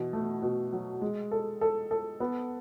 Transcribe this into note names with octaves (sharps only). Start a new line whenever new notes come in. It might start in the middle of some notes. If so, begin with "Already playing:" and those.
Already playing: B2 E3
A3
B2
F#3
G#3
A4
A4
A4
B3